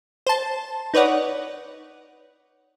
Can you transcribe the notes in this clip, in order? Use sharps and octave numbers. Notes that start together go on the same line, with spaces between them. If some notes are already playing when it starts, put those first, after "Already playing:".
C5 A5
D#4 B4 C#5 D5 F#5